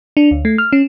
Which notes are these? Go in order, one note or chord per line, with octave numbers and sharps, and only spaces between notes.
D4
D2
A3
F6
C#4